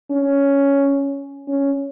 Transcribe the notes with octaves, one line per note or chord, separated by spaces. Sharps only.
C#4
C#4